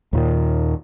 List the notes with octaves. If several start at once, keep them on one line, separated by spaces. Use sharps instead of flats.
D#2 A#2 D#3